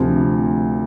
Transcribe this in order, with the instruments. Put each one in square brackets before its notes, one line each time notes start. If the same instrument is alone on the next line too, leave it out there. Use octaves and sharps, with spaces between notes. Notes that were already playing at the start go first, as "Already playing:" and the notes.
Already playing: [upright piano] D2 C3 F3